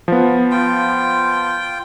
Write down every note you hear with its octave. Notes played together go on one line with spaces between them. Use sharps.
F3 B3
F4 G5